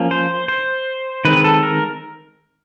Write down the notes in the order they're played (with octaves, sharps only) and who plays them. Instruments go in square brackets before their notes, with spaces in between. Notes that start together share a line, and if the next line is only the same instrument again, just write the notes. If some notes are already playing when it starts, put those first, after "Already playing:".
Already playing: [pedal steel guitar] F3 A#3 C#4
C5
C5
D#3 G#3 C4 B4
A4
A#4